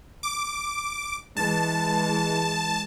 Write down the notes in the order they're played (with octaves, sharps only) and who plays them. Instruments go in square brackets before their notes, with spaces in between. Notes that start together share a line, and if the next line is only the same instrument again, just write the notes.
[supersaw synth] D6
[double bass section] E3 G#3 [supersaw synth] A5